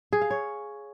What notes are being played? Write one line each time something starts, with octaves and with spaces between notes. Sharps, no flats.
G#4
F5
C#5